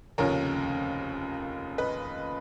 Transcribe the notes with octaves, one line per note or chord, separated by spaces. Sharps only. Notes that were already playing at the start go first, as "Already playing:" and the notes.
F1 D#2 C#3 F3 A#4 C#5
B4 D#5